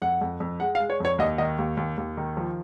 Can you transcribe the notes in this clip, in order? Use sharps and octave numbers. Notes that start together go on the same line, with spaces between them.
F2 F#5
F2
F2
G#3 F#5
F5
G#3
C#5
F2 C#5
D#2 D#5
D#3 D#5
D#2
D#2
D#2
D#3
F3